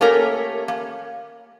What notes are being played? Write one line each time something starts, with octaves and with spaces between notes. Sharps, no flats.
A3 A#3 C#4 G4 A#4
A#3